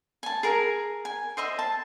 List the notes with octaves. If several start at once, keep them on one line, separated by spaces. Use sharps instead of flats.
G#5 A5
G#4 A#4 G#5 A#5
G#5
C5 D#5 E5 C6
A5